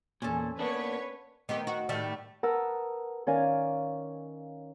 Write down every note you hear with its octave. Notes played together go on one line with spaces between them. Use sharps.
E2 A#2 C#4 A4
A#3 B3 D4 B4 C#5
D#3 B3 C4 G4
F#4
A2 D#3 G3 A3
A#4 B4 F#5 A5 D#6 E6
D#3 C#4 A#4 D5 F5 G#5